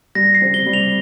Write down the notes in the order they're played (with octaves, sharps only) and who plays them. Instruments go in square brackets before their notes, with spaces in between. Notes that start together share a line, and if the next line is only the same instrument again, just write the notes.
[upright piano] G3 [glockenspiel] A#6
[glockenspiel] C7
[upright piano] C4
[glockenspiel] G7
[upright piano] G3
[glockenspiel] F7